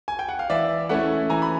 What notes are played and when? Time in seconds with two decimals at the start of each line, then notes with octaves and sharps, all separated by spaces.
0.08 G#5
0.19 G5
0.29 F#5
0.39 F5
0.50 E3 D5 E5
0.89 A3 C#4 E4 E5 F#5
1.29 E3 G#5 A#5
1.42 B5